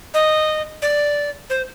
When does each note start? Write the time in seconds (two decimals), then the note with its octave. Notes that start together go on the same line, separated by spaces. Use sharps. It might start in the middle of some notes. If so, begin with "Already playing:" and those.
0.14 D#5
0.82 D5
1.50 C5